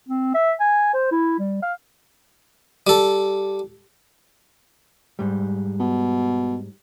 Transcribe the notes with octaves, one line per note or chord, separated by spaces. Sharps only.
C4
E5
G#5
C5
E4
G3
F5
G3 A4
G#2 G3
B2